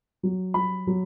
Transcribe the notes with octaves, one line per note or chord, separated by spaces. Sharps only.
F#3
F#3 B5
F#3